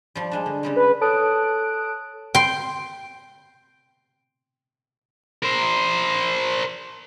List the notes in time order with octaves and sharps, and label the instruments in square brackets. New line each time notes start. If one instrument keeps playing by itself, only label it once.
[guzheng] F3 G3
G3 G#3 D4
D3
C#3 G3 G#3
[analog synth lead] B4
[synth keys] A4 C#5 A5 D#6 F#6 D7
[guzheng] G5 C6
[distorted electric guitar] A#4 C5